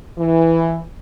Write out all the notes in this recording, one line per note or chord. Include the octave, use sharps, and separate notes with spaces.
E3